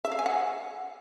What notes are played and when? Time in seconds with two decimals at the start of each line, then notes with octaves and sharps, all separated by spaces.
0.05 E5
0.12 F5
0.19 G#5
0.26 F#5